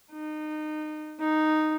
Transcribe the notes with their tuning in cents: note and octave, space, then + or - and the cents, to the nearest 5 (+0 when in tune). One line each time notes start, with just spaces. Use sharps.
D#4 -25
D#4 -5